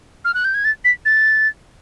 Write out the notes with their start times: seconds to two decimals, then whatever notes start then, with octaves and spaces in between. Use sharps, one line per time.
0.25 F6
0.34 F#6
0.44 G6
0.54 G#6
0.65 A6
0.85 B6
1.05 A6